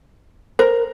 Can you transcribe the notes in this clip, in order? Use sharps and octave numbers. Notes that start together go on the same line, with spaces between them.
A#4 C5